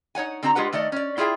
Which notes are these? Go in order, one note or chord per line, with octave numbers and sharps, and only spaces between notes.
D#4 C#5 F#5 G#5
D3 C4 D4 F#4 A#5
G#3 F4 G4 B4 F#5
D#3 A3 D5 D#5
C#4 D5
B3 E4 F4 G#4 E5 G5